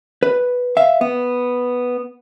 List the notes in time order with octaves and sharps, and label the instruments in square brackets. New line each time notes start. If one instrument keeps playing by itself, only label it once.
[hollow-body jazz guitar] B4
E5 F5
B3